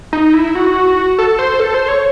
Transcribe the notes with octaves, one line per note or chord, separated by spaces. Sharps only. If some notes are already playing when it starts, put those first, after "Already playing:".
D#4
E4
F#4
A4
C5
A4
C5
C#5